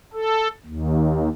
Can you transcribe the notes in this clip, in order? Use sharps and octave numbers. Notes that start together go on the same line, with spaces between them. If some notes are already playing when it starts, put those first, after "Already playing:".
A4
D#2